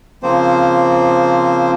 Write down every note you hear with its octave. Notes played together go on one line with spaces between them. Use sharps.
C#3 F3 A#3 C4 C5